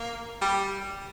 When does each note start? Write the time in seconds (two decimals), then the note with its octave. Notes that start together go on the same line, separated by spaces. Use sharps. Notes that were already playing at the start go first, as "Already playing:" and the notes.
Already playing: A#3
0.41 G3